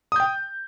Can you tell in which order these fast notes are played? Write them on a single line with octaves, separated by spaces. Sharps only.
D#6 G6 G5